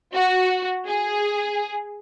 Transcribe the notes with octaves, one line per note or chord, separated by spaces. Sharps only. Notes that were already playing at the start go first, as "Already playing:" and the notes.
F#4
G#4